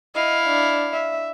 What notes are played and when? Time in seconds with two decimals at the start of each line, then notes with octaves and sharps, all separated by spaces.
0.15 E4 D#5 F5
0.47 D4
0.93 E5